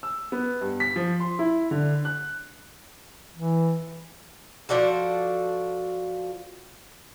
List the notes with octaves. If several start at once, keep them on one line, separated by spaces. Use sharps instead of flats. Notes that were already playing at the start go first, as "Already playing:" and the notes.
E6
B3
G2
B6
F3
C6
E4
D3
F#6
E3
F3 D4 F#4 A4